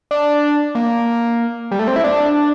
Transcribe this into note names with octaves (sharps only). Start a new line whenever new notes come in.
D4
A#3
G3
A3
C4
E4
D4